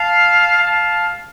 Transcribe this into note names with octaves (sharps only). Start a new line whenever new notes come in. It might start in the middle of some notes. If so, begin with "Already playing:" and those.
Already playing: F5 A5
F5 A5